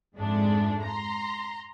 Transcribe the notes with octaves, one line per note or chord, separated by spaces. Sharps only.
F2 G#2 G#3 A3 D4
A#5 C6